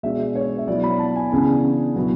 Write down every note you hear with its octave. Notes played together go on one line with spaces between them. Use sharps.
B2 G#3 D4 E5
C#5
E5
B2 F#3 B3 E4 D5
B5
A5
G#5
C#3 E3 B3 D4
B2 F#3 B3 E4